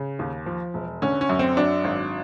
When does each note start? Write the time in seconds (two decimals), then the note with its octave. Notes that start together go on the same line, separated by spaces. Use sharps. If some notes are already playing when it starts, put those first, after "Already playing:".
Already playing: C#3
0.19 D#2
0.46 F3
0.74 E1
1.02 D3 C#4
1.21 C#4
1.29 F#2
1.39 C4
1.57 F#3 D4
1.84 G#1